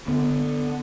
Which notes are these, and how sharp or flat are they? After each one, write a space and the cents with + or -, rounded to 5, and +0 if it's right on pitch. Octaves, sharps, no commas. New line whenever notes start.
D3 +5 B3 +0